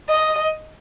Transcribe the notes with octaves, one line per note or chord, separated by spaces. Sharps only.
D#5